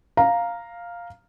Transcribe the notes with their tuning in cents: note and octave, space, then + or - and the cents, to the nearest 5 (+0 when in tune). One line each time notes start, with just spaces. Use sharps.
F5 +0 A#5 +0